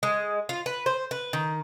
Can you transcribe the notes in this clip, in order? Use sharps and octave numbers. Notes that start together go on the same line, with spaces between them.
G#3
F4
B4
C5
B4
D#3